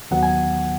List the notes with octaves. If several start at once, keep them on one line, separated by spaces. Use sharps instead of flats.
D#2 D#3 F#3 B3 F#5
G#5